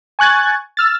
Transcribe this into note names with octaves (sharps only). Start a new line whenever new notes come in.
G#5 C#6 F#6 G#6 A6
E6 F6 A6